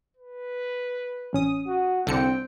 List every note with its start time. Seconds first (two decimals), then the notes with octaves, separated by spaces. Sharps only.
0.17 B4
1.33 A1 C#4 D#6
1.67 F#4
2.07 C2 D3 C4 G5 C#7